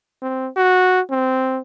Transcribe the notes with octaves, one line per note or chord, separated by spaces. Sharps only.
C4
F#4
C4